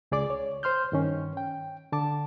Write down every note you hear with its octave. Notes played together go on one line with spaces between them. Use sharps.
C#2 G#4 D5 D6
C#5
C5 C6 F6 G6
G2 D#3 C#4
G5
D3 A5 D6